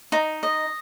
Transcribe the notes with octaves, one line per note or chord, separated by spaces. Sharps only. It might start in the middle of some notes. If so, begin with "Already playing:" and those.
D#4
D#5